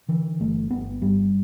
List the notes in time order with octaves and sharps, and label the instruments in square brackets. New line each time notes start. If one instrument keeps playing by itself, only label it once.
[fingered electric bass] D3 E3
G1 A3
G1 B3
G2 G3